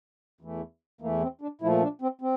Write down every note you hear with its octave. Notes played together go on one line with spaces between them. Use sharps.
E2 E3 A3
E2 E3 A3 A#3
C4
D4
A#2 F3 A3 E4
D4
C4
C4